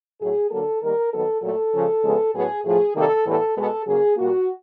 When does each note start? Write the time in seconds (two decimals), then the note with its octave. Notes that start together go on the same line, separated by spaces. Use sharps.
0.21 A2 F#3 A3 G#4
0.51 D3 F#3 A#3 A4
0.81 D#3 G3 A#3 A#4
1.12 D#3 F#3 B3 A4
1.42 A#2 F#3 A3 A4
1.73 C#3 F3 G#3
2.04 C#3 F3 G#3 B3
2.35 A2 F#3 B3 G#4
2.65 A2 F3 A3 G#4
2.95 C3 D#3 G3 A#3 A4
3.25 A2 E3 G3 B3 A4
3.57 B2 G#3 B3 A4
3.87 C#3 F#3 A#3 G#4
4.17 A#2 G3 A#3 F#4